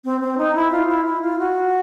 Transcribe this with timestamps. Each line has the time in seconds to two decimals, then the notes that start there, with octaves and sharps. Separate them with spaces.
0.05 C4
0.21 C4
0.38 D#4
0.55 E4
0.71 F4
0.88 E4
1.05 E4
1.22 F4
1.39 F#4